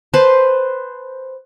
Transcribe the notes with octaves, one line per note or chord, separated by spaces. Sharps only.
B4 C5 A5